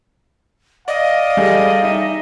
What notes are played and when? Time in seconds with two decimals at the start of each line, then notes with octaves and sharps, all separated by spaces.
0.88 D5 D#5 F5
1.37 G3 G#4 A4
1.82 D#4 E5